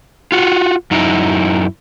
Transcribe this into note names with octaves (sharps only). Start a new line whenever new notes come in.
F4 F#4
F#2 D#4 E4